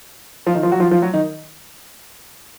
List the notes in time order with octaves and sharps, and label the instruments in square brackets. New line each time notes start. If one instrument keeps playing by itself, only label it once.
[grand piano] F3 F4
D#3 D#4
F3 F4
F#3 F#4
F3 F4
F3 F4
F#3 F#4
D#3 D#4